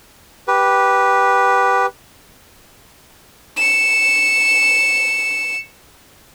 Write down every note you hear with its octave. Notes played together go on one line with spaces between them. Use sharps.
G4 B4
C#7 E7